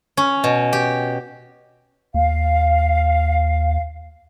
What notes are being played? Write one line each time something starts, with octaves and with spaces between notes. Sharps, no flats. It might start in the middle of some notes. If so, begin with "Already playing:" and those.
C#4
B2
G4
D#2 F5